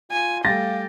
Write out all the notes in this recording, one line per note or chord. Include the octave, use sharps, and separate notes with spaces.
F4 G#5
G3 A3 G4 F5 A6 A#6